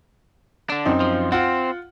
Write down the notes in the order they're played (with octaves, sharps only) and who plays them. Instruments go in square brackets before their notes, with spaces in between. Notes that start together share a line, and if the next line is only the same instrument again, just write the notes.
[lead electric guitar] D3 D4
[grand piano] F#2 C4 D#4
[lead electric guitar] F3
[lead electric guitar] C4 [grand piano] F4 F#5